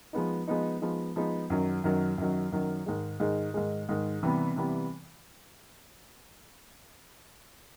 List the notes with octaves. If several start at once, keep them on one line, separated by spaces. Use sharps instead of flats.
F3 G#3 B3 D#4
F3 G#3 B3 D#4
F3 G#3 B3 D#4
F3 G#3 B3 D#4
F#2 D#3 F#3
F#2 D#3 F#3
F#2 D#3 F#3
F#2 D#3 F#3
G#2 D#3 G#3
G#2 D#3 G#3
G#2 D#3 G#3
G#2 D#3 G#3
C3 E3 G3 B3
C3 E3 G3 B3